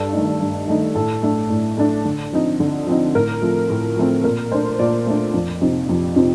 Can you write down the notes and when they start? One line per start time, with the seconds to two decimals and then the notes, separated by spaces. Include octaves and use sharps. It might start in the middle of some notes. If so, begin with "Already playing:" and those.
Already playing: G2 A4
0.13 D#3 A3 D#4
0.40 G2
0.68 D#3 A3 D#4
0.95 A2 A4
1.23 A3 D4
1.50 A2
1.78 A3 D4
2.05 D3
2.32 F3 C4 D#4
2.60 D3
2.87 F3 C4 D#4
3.15 A2 A#4
3.42 F3 A3 C4
3.70 A2
3.97 F3 A3 C4
4.24 A#2 A#4
4.51 A3 D4 C5
4.79 A#2 D5
5.06 A3 D4
5.34 F2
5.61 C3 F3 C4 D#4
5.89 F2
6.16 C3 F3 C4 D#4